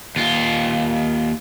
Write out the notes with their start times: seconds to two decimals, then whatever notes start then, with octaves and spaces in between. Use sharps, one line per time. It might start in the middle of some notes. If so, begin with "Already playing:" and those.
0.16 D#2 F4